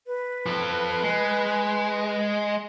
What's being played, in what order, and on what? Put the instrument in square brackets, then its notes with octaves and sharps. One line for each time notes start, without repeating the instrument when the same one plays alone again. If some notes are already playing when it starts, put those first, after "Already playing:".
[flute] B4
[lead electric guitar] F3 A4
G#3